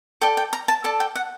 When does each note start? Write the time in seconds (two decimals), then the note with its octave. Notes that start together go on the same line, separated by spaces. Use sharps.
0.21 A4 D5 G5
0.37 G5
0.53 A#5
0.68 A5
0.84 A4 D5 A5
1.00 G5
1.15 F#5